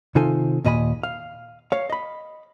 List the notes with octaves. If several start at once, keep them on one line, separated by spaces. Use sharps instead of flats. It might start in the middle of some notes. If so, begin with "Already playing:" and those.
C3 D#3 D#4 F4 A4 G#5
D#2 A#2 D#5 G#5 B5
F5
C#5 F5
D#5 B5